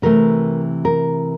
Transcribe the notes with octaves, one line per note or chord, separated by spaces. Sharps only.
C3 E3 A3 A#4
A#4